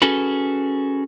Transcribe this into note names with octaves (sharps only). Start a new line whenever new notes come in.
C#4 F#4 G#4 A4 B4